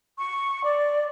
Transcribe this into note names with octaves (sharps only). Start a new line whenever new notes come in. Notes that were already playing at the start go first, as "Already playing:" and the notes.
C#6
D5